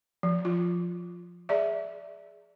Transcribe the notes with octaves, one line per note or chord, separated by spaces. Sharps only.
F3
F4
G#4 D5 E5